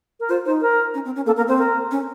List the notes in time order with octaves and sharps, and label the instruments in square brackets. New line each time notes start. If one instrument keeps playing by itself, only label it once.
[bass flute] A#4
[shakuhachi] F4 [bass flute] C5
[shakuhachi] D#4 [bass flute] C5
[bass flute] A#4
[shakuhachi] C#4
C4
C#4
[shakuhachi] A#3 [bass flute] A4
[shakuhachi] A#3 [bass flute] A#4
[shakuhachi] C4 [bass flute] C5
[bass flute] A#4
[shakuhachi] C#4